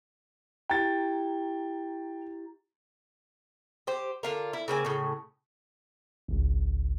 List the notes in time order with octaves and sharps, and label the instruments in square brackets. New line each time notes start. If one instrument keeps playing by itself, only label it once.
[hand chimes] E4 G4 A#5 [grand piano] G5 A6
[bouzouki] G4 C5
D3 F4 A#4
E4
C#3 A#3 C4 G#5
A2 C#3
[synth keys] G#1 C#2